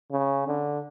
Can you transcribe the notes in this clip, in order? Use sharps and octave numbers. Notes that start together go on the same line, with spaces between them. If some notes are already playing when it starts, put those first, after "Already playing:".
C#3
D3